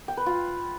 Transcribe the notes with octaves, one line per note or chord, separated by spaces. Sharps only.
G5
B4
F4